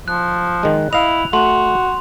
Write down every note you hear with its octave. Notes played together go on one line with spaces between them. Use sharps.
F3 F#6
D#3 G#3
E4 D#5 F5 F7
A3 F#4 C6